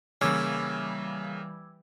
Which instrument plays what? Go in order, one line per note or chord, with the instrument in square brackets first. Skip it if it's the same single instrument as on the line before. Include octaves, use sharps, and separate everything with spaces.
[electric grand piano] C#3 A#3 [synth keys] E3 G3 [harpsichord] C#4 [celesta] D6 E6 G#6